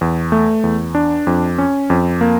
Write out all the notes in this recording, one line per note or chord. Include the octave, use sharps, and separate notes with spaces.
E2
A3
E2
D4
F2
C#4
F2
A#3